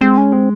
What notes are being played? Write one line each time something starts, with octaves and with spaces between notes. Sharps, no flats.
G#3 C4
C#4
G#3 C4